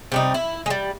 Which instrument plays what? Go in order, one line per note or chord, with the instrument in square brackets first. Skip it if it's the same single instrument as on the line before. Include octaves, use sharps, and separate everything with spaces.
[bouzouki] C3 G3 D#4
E4
G3 G#3